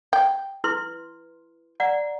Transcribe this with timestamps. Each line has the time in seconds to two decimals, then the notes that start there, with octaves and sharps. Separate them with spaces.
0.13 G5
0.64 E4 B4 C6
1.80 D5 F#5 A#5